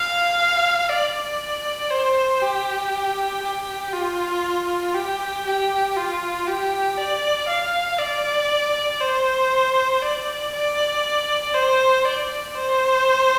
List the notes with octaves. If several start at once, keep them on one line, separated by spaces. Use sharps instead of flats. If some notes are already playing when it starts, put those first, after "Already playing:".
Already playing: F5
D5
C5
G4
G4
F4
G4
G4
F4
G4
D5
F5
D5
C5
D5
D5
C5
D5
C5